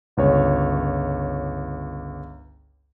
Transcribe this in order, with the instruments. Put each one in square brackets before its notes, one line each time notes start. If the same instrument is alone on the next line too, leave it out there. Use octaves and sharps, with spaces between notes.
[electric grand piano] G1 C#2 C#5